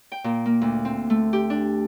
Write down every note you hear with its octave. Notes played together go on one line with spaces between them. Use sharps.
G5
A#2
A#3
D2
C4
A3
G4
D4